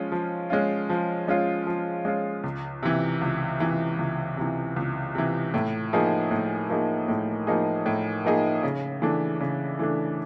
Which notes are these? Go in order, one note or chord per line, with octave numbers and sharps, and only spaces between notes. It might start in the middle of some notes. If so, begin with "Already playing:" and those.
Already playing: F3 G#3 C#4 F4
F3
G#3 C#4 F4
F3
G#3 C#4 F4
F3
G#3 C#4 F4
C#2
C3 E3
C#2
C3 E3
C#2
C3 E3
C#2
C3 E3
A2
F3 A#3 D#4 G#4
A2
F3 A#3 D#4 G#4
A2
F3 A#3 D#4 G#4
A2
F3 A#3 D#4 G#4
C#3
E3 A3 D4
C#3
E3 A3 D4